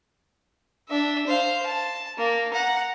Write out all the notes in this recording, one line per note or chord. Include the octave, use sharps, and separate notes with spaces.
D4 E5
C5 F5
A5
A#3
F#5 A#5